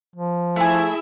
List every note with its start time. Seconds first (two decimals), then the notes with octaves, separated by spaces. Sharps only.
0.15 F3
0.56 A3 E4 G#4 E5 G#5